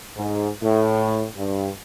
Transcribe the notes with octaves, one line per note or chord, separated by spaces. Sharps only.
G#2
A2
G2